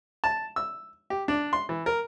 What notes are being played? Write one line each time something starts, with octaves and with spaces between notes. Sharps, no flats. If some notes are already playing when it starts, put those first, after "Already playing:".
A5
E6
G4
D4
C6
E3
A#4